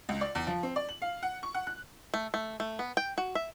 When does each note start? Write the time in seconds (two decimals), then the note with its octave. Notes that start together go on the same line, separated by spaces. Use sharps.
0.09 C#2
0.21 D5
0.35 E2
0.47 F3
0.63 C4
0.76 D5
0.89 F#7
1.02 F5
1.23 F#5
1.43 C#6
1.54 F#5
1.67 F#6
2.14 A3
2.34 A3
2.60 A3
2.79 B3
2.97 G5
3.18 F#4
3.35 E5